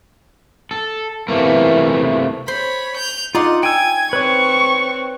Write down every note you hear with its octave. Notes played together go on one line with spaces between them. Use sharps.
A4
C3 E3 A3 A#3
C5 C#5 B5 C6
G6 F7
D#4 F4 D5 F#5 C6
G5 G#5 E6 G#6
C4 B4 C#5 C#6